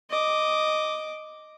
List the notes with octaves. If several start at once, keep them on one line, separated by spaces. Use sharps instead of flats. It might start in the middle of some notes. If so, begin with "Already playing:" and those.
D#5 D6